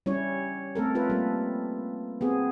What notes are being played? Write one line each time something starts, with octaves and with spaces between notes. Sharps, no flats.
G3 C#4 E4 C#5
A3 C4 A4 A#4
F4 A4 B4
G3 A#3
B3 C4 G#4